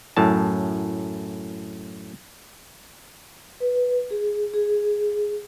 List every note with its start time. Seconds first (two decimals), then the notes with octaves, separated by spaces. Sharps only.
0.17 F#2 A2 A5
3.60 B4
4.11 G#4
4.54 G#4